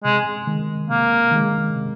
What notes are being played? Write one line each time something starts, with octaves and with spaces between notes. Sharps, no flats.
C3 G#3
D#3 G#3
C3 A#3
D#3 G#3
C3